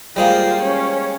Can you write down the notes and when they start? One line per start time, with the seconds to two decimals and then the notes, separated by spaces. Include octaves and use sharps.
0.16 G3 G#3 A#3 F4 C5
0.62 C#4 C#5